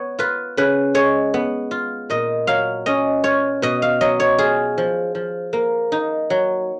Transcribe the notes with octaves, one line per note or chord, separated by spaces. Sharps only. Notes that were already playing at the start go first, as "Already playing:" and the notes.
Already playing: B3 C#5
F4 B4
C#3 B4
G#3 C#5
B3
F4
A#2 D#5
F#3 F5
C#4 D#5
F4 C#5
B2 D#5
F5
F#3 D#5
C#5
F4 G#4
F3
F3
A#3
D#4
F#3